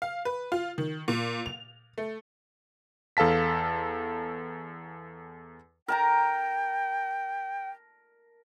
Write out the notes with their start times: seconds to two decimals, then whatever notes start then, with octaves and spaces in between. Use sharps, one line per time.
0.02 F5
0.25 B4
0.52 F4
0.78 D#3
1.08 A#2
1.46 F7
1.98 A3
3.17 E2 A4 F5 A5 B6
5.88 A#4 G5 A5 A#5